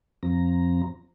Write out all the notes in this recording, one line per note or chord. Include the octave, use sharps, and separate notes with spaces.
F2 F3 C4 A#5